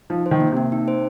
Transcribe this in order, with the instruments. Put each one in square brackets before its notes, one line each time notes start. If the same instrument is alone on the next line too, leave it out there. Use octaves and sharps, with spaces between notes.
[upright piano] F3 [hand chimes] D#4
[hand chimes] C5
[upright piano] D#3
[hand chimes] A#3
[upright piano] C3 [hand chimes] A#3
[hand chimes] D#4
C5